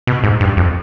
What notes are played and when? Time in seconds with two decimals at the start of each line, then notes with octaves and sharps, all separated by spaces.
0.07 B2
0.24 G#2
0.41 G2
0.57 F2